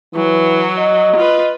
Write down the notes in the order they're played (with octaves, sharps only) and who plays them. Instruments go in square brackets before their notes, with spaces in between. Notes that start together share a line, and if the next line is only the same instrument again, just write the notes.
[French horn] E3 [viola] F#3
[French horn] D#5
[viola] F4 B4